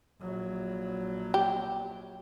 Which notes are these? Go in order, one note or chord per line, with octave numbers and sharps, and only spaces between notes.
A#1 F#3
G4